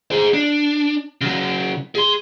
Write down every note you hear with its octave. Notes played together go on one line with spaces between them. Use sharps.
G#4 C5
D4
C#3 F#3
G#4 C6